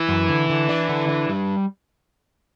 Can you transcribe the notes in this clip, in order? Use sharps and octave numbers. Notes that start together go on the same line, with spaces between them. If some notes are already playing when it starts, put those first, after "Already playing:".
Already playing: E3
F#2
D3
D3
D4
D3
D4
G3